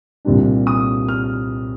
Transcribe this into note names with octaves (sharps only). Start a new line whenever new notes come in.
C2 A#2 G3 D4
D#6
F6